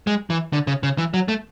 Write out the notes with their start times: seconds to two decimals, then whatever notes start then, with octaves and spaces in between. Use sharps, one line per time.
0.07 G#3
0.30 E3
0.53 D3
0.67 C#3
0.83 C#3
0.98 E3
1.14 F#3
1.28 A3